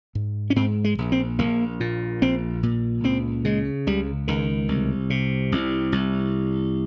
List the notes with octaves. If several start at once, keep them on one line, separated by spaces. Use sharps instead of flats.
G#2
C#4
G#2 C4
G#3
A#1
C4
A#1 A#3
A#2
A#1 C4
A#2
C#2 C4
C#3 G#3
C#2 G3
C#2 D#3
C2
C3
C2
C2